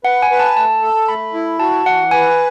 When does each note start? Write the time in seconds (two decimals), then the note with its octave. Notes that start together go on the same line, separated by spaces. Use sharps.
0.04 B4 F#5
0.22 G#5
0.31 B4
0.40 A5
0.57 A3 A5
0.82 A4
1.08 A3 B5
1.34 E4
1.60 F#4 A5
1.86 E3 F#5
2.11 B4 G#5